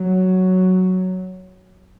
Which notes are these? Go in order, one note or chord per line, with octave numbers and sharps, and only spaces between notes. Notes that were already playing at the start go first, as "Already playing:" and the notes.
Already playing: F#3